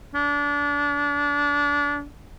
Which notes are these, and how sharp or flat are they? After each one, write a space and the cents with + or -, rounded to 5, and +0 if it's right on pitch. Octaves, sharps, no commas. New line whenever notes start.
D4 -30